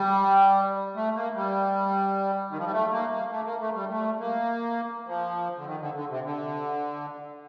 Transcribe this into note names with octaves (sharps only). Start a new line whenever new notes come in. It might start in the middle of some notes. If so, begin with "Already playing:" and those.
Already playing: G3
A3
A#3
G3
D#3
F3
G3
A3
A#3
A#3
A3
A#3
A3
G3
A3
A#3
F3
D3
D#3
D3
D3
C3
D3